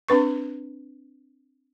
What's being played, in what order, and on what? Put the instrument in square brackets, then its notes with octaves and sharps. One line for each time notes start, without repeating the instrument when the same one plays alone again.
[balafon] C4 D4 B4 C#6